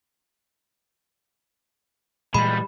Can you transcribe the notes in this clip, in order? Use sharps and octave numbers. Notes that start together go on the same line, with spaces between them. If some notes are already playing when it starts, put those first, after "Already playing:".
A#2 E3 G3 G#3 B5